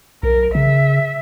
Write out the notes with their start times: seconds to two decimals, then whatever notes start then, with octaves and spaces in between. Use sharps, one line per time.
0.23 B1 A#4
0.55 C#3 E5